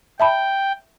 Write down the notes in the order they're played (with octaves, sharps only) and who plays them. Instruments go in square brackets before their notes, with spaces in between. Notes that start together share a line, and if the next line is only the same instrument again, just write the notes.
[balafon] E5 A5 B5 [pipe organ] G5